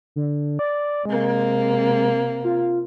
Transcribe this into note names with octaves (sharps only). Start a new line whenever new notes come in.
D3
D5
C3 G#3 A#3
F4